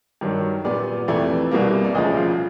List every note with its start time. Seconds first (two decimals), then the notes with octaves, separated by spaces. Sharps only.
0.21 G2 D#3 F#3
0.65 A#2 G3 B3 D5
1.08 F2 C3 E3 A3 D5
1.51 C2 B2 G3 A#3
1.84 D5
1.95 D2 C#3 F3 D#5
2.17 F5